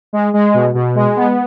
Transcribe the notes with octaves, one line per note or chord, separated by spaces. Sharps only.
G#3
G#3
B2
B2
G#3
B3